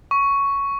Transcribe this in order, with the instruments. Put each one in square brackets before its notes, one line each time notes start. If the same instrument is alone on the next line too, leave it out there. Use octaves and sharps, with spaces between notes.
[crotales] C#6